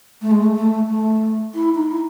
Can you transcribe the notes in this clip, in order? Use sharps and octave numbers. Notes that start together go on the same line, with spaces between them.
A3
G#3
A3
A3
A3
E4
D#4
E4